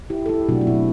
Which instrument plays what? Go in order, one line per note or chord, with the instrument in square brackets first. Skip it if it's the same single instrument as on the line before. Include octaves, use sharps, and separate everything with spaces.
[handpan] E4 G4
A4
E4 G4
B2 F#3 A3 D4 F#4
F#4
C4 E4